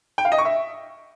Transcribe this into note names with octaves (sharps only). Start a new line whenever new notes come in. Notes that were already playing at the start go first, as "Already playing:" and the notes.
G5
F5
D#5
C#6
E5